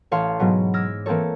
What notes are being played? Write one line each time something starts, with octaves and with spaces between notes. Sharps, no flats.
A1 C#5 F5 A5 C6
G#2 B2 F#3 B3
D6 E6 F6 G#6 A#6
E3 A#3 C4 A4 C#5